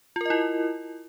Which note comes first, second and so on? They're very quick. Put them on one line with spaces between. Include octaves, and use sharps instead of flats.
F4 A#4 D#5 E4